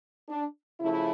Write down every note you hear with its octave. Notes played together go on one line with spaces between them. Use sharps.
D4
C#3 F3 A3 E4